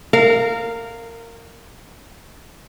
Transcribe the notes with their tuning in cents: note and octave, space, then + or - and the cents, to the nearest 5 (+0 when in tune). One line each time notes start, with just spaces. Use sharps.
A#4 -20 F5 +0